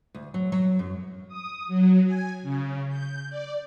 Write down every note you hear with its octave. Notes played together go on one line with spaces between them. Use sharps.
D2
F#3
F#3
F#2
D#6
F#3
G#5
C#3
G6
D5